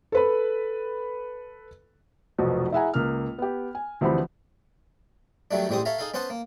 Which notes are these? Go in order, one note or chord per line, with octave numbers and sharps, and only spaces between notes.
A4 B4 B5
F1 B1 B2 F3 F#4
E4 G#4 E5 F#5 G#5 A#5
C#2 A#3 F6
B3 G4
G#5
D2 E3 F3 C4 G4 B5
D#3 F#3 G3 A3 D4
A1 G#2 G3 G#3 C4 D#6
A4 C#5 E5 F5 A#5
D#4 G#4 A4 F5
B3 C#4 C5 F#5 A5
A#3